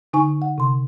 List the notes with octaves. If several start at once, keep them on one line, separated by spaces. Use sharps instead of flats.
D3 D#4 G#5 C#6
F#5
C3 C6